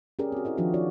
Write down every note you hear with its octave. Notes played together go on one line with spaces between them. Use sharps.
C#4 G4 G#4 A#4 D5
C4 F#4
E4 A#4 D#5
D#3 F3 D4 F4 F#4 A#4
D#4 F4 F#4 C#5 D5